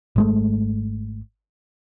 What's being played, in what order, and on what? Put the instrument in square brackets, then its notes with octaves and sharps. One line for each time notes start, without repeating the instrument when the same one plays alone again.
[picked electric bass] G#1 G#3 A3